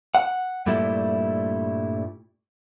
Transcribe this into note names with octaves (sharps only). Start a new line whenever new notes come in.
F#5
G2 A#2 G3 A3 E4